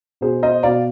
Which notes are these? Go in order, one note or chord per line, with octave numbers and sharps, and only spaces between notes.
B2 G#4 C5
C5 D#5
B2 D5 F5